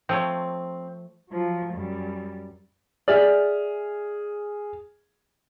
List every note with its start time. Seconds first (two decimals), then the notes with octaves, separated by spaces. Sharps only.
0.09 F3 A3 C4 C#5
1.30 F3 F#3
1.74 F#2 G3
3.08 G#4 D5 E5 F6